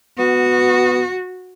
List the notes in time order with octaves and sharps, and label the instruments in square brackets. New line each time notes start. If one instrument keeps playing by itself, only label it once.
[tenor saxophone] B3 [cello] F#4